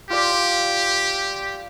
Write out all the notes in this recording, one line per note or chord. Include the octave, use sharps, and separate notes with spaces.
F4 G4 D5